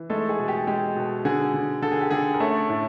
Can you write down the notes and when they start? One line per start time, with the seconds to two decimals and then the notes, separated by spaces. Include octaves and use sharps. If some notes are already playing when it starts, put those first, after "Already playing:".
Already playing: E3
0.10 G#3 A3 A4
0.29 G#4
0.39 B2
0.48 G4
0.67 G#3 G4
0.96 B2
1.25 D3 G#4
1.54 D3
1.82 D3 A4
1.92 G#4
2.01 G4
2.11 D3 G#4
2.34 A#4
2.40 A3 C#4 A4
2.69 A2